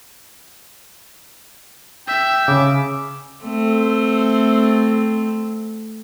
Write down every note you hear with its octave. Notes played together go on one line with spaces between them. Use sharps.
E5 G5
C#3 D6
A3 C4